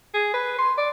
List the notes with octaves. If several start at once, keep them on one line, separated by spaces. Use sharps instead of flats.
G#4
B4
C6
D5